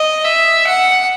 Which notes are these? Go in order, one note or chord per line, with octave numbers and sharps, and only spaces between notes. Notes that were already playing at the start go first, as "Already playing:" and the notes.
Already playing: D#5
E5
F#5